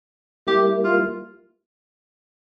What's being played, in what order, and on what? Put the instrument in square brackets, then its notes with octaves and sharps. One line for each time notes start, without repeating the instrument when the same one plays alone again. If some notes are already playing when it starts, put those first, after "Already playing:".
[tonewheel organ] G3 A#3 E4 [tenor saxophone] G4
[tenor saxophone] F4